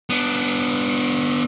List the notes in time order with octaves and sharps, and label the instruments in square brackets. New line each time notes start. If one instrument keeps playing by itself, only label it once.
[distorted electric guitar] B3 D4